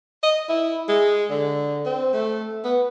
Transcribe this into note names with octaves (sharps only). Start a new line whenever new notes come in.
D#5
E4
G#3
D3
C4
A3
B3